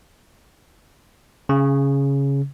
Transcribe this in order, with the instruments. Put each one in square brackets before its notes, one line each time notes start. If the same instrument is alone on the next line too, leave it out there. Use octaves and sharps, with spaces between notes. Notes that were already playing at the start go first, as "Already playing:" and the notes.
[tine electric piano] C#3